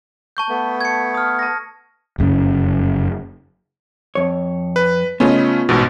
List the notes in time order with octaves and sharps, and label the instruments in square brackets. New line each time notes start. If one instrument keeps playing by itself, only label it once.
[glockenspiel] A5 C#6 G6
[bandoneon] A3 B3
[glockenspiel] G#6 C#7
D#6 F6
A5 A#6
[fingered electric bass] F1 F#2 A#2 C#3
[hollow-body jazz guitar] F2 C#5
[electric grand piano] B4
[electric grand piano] C#3 A3 C#4 [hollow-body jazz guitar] B3 F4 D#5
[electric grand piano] A1 G#2 B2